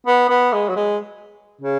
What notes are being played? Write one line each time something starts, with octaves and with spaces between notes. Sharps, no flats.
B3
B3
G#3
F#3
G#3
C#3